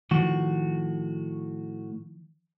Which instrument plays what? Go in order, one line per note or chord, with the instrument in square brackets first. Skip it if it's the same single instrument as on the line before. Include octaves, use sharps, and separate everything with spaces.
[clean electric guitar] A2 F#4 [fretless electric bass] D#3 F3